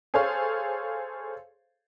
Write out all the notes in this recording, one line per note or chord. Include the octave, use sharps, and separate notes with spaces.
G#4 A4 C5 C#5 F5